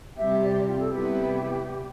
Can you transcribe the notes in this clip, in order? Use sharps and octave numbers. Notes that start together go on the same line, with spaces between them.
C3 G3 C4 G4 E5
D5
F4
A4
C3 G3 B3 E4 G4 B4